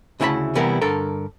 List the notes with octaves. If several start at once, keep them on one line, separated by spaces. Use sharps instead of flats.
D2 C#3 E4 F#5 A5 B5
C3 E3 G3 B3 E4 A#4
G2 D3 A4 A#4